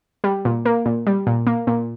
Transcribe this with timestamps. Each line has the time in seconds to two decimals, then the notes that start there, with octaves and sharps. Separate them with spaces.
0.24 G3
0.45 A#2
0.65 A#3
0.86 A#2
1.07 G3
1.27 A#2
1.47 A#3
1.67 A#2